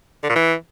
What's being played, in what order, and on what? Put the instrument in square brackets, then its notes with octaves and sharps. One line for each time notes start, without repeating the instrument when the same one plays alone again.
[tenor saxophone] D3
A#2
E3